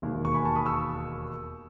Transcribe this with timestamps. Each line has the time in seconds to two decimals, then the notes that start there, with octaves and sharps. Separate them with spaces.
0.02 E1 D#2 D#3
0.25 C#6
0.34 G#5 B5
0.45 A5 C#6
0.56 B5 D#6
0.66 C#6 E6